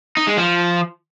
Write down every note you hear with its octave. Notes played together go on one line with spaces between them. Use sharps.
D#4
G#3
F3